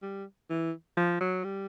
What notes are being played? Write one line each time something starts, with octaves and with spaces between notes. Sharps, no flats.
G3
E3
F3
F#3
G3